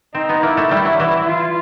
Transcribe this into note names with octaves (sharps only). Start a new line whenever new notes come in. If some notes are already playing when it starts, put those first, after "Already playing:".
C4 D#4
B3
A#3 E4
A3
G3 E4
F#3
E3
F4